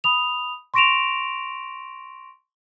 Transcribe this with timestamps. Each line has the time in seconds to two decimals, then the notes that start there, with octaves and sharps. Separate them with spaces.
0.04 B5 D#6 F7
0.74 C6 C#6 A#6 D7 E7 F7